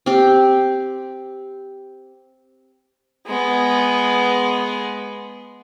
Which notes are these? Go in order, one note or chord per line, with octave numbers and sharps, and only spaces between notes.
C4 G4
G#3 B3